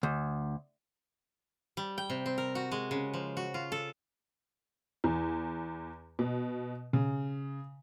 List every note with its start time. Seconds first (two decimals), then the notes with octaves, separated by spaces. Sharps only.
0.03 D2
1.77 G3
1.98 G5
2.10 C3
2.26 C4
2.38 A#4
2.55 F#4
2.72 G#3
2.91 C#3
3.14 F3
3.37 F#4
3.54 F4
3.72 A4
5.04 E2
6.19 B2
6.93 C#3